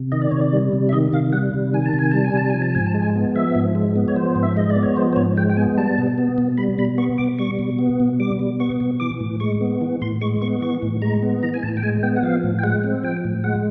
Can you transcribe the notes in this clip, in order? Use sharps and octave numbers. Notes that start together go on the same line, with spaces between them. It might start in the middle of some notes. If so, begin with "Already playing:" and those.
Already playing: C3
D#3 D#5
D5
C3 C#5
D5
G3
C3
E5
D#3 D#5
C3 F5
G3 F#5
C3
D#3 G#5
A5
C3
G#5
G3 A5
G#5
C3 A5
F3 G#5
A5
G#2 G#5
A5
G#3
G#5
B3
F3 E5
G#2
G#3
B3
C#5
F3 C5
G#2
E5
G#3 D#5
D5
B3
C#5
F3 C5
C5
G#2 C#5
G#3 G5
G5
B3 G#5
G3 A5
B2
B3
B2
G3 B5
B2 B5
B3 C#6
B2 D6
G3 C#6
B2
B3
B2
G3 D6
B2
B3 C#6
B2
E3 D6
A2
G#3 C#6
B3
E3
A2 C6
G#3 C#6
B3 C#6
E3 C#6
A2
G#3 A#5
B3
E3 A#5
G#5
A2 A5
G5
G#3 G#5
B3 G5
F#5
F3 F5
A2
G5
G#3 F#5
C4
F3 G5
A2
G#3 F#5